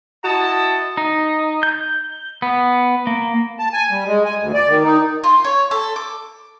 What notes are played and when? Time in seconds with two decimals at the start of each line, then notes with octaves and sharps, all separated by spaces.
0.24 E4 F#4 D#5 A5
0.97 D#4
1.63 G6
2.42 B3
3.07 A#3
3.59 A5
3.73 G#5
3.91 G3
4.07 G#3
4.25 G#5
4.40 D2
4.54 D5
4.69 D#3
4.83 D#4
5.24 F4
5.44 C#5
5.71 A4
5.96 D6